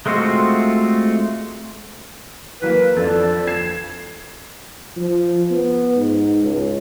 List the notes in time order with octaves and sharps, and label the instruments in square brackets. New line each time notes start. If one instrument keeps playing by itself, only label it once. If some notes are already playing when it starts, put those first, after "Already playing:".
[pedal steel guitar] G#3 A3 C4 F4 F#4
[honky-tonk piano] E3 F#3 A#3 [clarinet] B4
[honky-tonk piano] F2 D4 [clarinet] A4
[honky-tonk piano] G#6 C7 E7
[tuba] F3
B3
G#2
C#2